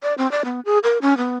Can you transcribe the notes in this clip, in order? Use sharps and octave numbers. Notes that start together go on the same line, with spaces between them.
D5
C4
D5
B3
G#4
A#4
C#4
B3